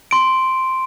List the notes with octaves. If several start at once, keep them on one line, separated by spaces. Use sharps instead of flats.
C6 D7